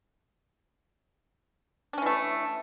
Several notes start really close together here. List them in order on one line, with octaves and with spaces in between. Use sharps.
D4 C#4 E3 A3